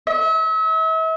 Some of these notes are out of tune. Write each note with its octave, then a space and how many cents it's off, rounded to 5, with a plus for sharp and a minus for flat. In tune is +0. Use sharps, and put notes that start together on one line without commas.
E5 -40